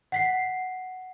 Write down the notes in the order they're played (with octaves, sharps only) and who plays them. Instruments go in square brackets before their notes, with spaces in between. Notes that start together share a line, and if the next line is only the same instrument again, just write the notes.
[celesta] F#5 B6 C7